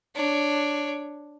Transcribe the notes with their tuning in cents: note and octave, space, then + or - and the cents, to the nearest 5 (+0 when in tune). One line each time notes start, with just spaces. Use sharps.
D4 +0 C#5 +0